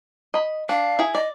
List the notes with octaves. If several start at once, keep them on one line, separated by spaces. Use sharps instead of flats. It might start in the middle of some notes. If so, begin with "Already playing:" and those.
D#5 B5
D4 F5
E4 G#4
D5 D#5